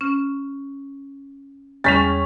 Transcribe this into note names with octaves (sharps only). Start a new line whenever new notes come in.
C#4 F6
E2 G3 C#4 C#6 A6 B6 F7